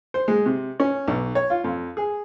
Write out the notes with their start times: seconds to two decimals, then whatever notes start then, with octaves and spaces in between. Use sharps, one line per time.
0.14 C5
0.28 G#3
0.46 C3
0.80 C#4
1.08 B1
1.35 C#5
1.50 F4
1.64 F2
1.97 G#4